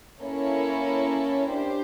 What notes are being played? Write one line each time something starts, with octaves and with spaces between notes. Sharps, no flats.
A#3 C#4 E4 A4 C#5
D4 G4 C5